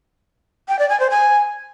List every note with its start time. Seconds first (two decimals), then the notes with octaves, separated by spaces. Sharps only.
0.69 G5
0.79 D5
0.89 G#5
1.00 C5
1.10 G#5